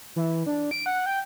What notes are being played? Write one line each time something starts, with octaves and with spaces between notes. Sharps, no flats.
E3
D4
D7
F#5
G5